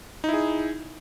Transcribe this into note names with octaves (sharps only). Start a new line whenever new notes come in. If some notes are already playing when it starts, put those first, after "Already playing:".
D#4 E4 G#4